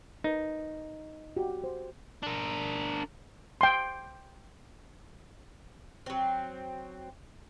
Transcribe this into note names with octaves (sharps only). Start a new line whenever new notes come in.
D#4 A#4 B4
F#4 G4
C5
D4 A#4
G5 C6
F#3 C4